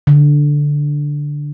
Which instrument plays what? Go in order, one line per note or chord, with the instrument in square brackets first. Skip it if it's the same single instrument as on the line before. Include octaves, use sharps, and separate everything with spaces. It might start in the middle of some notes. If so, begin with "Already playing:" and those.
[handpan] D3